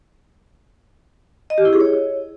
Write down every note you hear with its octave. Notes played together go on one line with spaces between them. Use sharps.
D#5
G4
E4
G#4
C#5